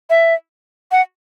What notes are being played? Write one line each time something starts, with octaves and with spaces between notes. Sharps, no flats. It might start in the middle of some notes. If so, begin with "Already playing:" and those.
E5
F#5